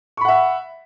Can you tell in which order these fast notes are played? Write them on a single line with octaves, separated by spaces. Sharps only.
C#6 B5 F#5 E5